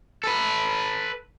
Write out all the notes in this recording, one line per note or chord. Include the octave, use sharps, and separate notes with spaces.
A4 B4